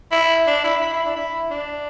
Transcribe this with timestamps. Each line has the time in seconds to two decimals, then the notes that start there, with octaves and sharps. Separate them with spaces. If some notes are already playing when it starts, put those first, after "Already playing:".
0.11 E4
0.47 D4
0.64 E4
0.82 E4
0.93 E4
1.05 D4
1.16 E4
1.51 D4